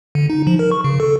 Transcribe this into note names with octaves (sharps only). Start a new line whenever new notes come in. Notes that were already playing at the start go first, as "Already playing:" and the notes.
D3
D#4
F3
A#4
C#6
C#3
A4